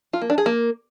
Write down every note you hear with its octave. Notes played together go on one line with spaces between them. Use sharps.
F4
A#3
D4
G#4
A#3